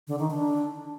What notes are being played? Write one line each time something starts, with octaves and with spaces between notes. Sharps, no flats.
D3
D#3
D4